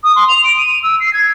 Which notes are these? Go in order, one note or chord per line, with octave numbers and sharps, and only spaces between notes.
D#6
C6
F7
D7
D#7
E6
C7
G#6